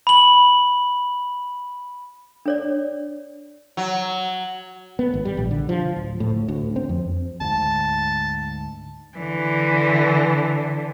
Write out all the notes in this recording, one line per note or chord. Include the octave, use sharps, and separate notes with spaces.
B5 F#7
D4 C#5 D5
F#3
B3
G#1
G3
A#1
D3
F3
D1
A2
D2
C4
F2
D2 G#2 A5
D3 E3